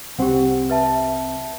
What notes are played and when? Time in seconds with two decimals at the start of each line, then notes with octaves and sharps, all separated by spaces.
0.19 C2 C4 G4 F#5
0.70 B4 E5 A5